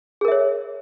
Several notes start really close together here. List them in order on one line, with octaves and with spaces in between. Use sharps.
G#4 A#4 E5 C#5